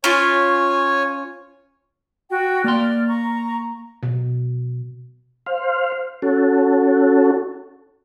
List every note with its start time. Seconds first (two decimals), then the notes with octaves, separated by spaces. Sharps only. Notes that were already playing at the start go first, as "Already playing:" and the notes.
0.04 C#4 F4 C#5 G#5
2.30 F#4 G5
2.64 A#3 D5 C6 F6
3.07 A#5 C#6
4.03 B2
5.46 C5 F5
6.22 C#4 F#4 A4